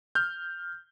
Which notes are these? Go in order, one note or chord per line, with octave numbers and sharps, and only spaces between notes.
F6 G6